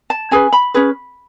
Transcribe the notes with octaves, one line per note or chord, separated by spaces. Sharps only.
A5
C#4 G#4 B4 G#5
B5
C#4 G#4 B4